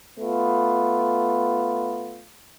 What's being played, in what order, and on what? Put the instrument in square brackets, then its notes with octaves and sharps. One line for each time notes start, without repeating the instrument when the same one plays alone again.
[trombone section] A3 B3 F4